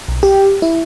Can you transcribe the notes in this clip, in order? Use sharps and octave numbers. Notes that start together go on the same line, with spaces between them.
B1
G4
E4